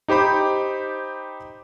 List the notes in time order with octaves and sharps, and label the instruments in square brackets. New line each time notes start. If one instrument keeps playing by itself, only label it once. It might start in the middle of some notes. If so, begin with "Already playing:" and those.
[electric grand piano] D#4 G4 C5 B5 D6